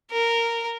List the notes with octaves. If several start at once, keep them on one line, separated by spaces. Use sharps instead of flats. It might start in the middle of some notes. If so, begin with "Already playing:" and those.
A#4